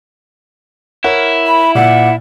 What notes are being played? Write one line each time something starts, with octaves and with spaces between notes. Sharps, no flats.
E4 A#4 C#5 F#5
B5
A#2 D5 E5 F#5